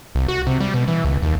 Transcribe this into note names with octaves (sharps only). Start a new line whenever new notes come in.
C2
F#4
C3
G3
B2
E3
C#2
D#2